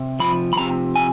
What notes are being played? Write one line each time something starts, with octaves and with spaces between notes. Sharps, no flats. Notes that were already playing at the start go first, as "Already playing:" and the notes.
Already playing: C3
F3 B5
B5
C3 A#5
G#5